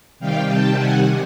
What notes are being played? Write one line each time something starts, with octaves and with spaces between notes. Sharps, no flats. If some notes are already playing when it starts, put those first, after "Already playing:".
C3 D#3 G3 F5 G5
G5 A5
F#5 G#5